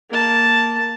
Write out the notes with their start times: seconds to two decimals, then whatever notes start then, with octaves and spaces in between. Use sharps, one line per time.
0.10 A#3 A5